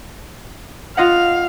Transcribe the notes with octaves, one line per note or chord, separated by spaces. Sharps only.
F4 D#5 F5 F#5